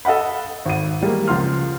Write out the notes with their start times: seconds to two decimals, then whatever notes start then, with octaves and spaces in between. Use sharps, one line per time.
0.05 A4 D#5 F5 F#5 B5
0.66 G#1 D#7
1.01 E3 G3 G#3 A#3
1.27 C#2 F3 F5 C6 F6